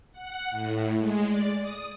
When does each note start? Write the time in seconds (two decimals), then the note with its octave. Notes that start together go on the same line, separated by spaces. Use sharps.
0.12 F#5
0.51 A2
0.99 G#3
1.28 D5
1.61 D#6